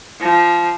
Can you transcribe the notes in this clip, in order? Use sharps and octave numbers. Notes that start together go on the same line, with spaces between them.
F3